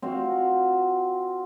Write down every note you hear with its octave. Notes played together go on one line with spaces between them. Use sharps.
C4 F4 F#4 F5